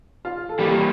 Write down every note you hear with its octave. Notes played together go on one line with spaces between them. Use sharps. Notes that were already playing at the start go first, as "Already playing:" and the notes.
F4
A4
E3 G3 A#3 G4